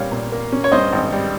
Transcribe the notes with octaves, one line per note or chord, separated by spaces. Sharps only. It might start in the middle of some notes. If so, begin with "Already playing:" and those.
Already playing: A#2 G3 A#3 C#4 C#5 F5
A#2
A#3
C#4
C#5
G2 C5 D#5
G#1
G3